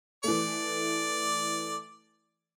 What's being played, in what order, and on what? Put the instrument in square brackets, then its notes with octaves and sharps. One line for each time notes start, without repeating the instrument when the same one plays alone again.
[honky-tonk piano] E3 A3 [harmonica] D5